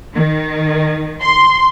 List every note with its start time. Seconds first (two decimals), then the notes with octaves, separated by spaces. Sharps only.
0.14 D#3
1.22 C6